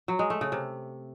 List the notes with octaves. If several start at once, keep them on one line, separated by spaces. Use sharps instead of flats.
F#3
G#3
A3
C#3
C3